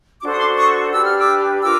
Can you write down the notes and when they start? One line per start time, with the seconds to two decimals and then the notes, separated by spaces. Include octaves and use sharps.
0.21 D4 F#4 A4 C5 D6
0.31 D#6
0.38 C6 D6
0.56 C#6 D#6
0.92 D4 G4 B4 E6
1.05 F6
1.19 D6 E6
1.63 F4 A#4 D6 E6